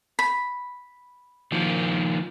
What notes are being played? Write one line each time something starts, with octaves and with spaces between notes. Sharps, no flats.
B5
D#3 F3 A#3